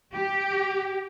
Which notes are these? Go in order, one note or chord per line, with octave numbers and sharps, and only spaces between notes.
G4